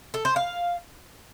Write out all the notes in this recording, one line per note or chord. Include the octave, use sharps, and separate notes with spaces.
A4
C5
F5